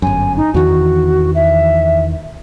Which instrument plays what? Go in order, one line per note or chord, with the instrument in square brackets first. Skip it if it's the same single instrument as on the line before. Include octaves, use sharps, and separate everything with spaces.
[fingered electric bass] G1 F#2 [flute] G#5
[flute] D#4
[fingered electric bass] E2 D#3 E3 [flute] F#4
[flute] E5